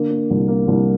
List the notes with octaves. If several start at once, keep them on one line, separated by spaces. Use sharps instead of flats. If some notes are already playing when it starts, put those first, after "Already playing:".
Already playing: D3 A#3
A#3
C2
A#3
C2